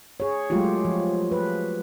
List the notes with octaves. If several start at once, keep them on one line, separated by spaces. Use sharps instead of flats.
G#4 C#5
F#3 G#3 A3 F4 G4
F3
B4